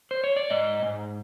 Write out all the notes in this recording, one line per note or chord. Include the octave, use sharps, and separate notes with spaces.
C5
C#5
D5
G#2 D#5
G#2